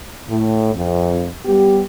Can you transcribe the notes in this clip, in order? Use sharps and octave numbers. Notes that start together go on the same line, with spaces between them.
A2
F2
G3 B3 G4